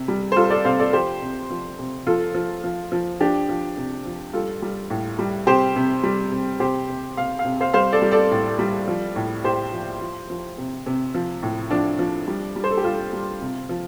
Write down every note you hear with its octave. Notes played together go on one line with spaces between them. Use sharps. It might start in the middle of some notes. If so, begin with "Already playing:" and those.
Already playing: C3
G3
C5
G3 F4 A4
A4 D5
C3 C5 F5
A4 D5
F3 G4 C5
C3
F3
C3
F3 F4 A4
F3
F3
F3
F3 D4 G4
F3
C3
F3
G3 F4 A4
G3
A2
G3
C3 G4 C5
C3
G3
C3
C3 G4 C5
C3
C3 F5
F5
C3
C5 F5
G3 C5 F5
A4 D5
G3
A4 D5
A2
G3
F3
A2
A2 G4 C5
F3
F3
F3
C3
C3
F3
A2
F3 D4
F3
G3
G3
C5
A4
G4
G3 F4
G3
C3
F3